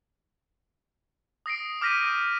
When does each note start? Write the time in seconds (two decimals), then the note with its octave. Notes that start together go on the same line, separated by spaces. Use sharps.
1.46 D#6 A#6 C7 D7
1.81 D6 F6 G6 A#6 B6 D#7
2.05 G6 D#7